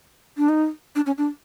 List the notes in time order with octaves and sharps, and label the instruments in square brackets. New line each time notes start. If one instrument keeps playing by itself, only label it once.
[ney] D4
D#4
D4
C#4
D4